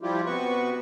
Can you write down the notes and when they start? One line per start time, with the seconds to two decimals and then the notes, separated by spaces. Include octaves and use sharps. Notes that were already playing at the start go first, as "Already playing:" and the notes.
0.01 F3 G3 E4 F4 G4
0.26 C3 B3 F#4 B4 C#6